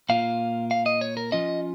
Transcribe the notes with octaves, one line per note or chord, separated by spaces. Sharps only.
A#2 A#3 F4 F5
F5
D#5
C#5
A#4
F3 C#4 F4 D#5